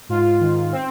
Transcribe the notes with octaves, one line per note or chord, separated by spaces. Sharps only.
G#2 F4
D#3
C4